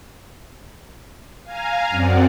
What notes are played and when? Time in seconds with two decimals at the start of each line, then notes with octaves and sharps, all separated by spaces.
1.43 F5 G#5 A#5
1.90 F#2 C4 D5 F#5